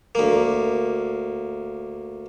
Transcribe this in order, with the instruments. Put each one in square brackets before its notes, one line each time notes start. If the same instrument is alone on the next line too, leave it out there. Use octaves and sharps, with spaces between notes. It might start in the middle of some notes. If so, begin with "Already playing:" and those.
[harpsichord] D2 A#3